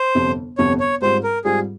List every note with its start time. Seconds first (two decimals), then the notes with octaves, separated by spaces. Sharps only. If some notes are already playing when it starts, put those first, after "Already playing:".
Already playing: C5
0.15 G1 F2 C3
0.58 G1 F2 C3 C#5
0.80 C#5
1.02 G#2 G3 C4 F4 C5
1.23 A#4
1.44 G#2 G3 C4 F4 G#4